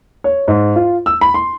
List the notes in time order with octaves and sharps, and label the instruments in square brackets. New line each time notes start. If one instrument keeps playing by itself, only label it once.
[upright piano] C#5
G#2
F4
E6
B5
C6